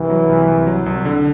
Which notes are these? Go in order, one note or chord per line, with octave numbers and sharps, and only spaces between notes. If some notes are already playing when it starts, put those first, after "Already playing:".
Already playing: C2 E3
F#3
C2
C2
F#3
C2
D3